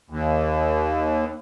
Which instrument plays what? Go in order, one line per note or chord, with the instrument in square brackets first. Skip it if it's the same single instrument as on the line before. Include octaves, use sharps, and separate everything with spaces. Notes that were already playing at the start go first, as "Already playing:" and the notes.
[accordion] D#2